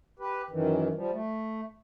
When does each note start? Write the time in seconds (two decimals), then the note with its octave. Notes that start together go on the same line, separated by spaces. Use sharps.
0.20 G4 B4
0.51 F#2 D#3 E3
0.95 F3 G3
1.12 A3